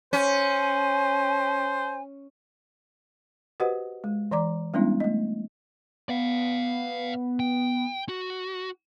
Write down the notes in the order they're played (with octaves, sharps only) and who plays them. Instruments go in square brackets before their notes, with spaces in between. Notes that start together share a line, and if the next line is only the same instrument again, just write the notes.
[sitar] C#4 [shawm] C5 [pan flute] G#5
[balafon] F#4 G4 B4 C5 D#5 F#5
G#3
E3 D5 A#5 D6
G3 G#3 B3 C#4 D4 E4
A3 D#5
[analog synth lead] B3 [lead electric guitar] D5 F5
[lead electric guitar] G5
F#4